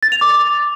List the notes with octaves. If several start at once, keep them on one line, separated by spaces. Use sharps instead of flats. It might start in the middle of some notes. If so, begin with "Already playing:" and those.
A6
F7
D6